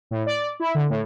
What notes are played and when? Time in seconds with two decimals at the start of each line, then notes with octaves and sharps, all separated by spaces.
0.11 A2
0.26 D5
0.60 E4
0.75 D3
0.90 A2